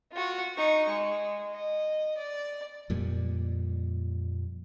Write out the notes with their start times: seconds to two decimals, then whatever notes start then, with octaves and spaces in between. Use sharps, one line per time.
0.13 F4 F#4
0.57 D#4 C#6
0.88 G#3
1.53 D#5
2.17 D5
2.90 F2 A#2 G3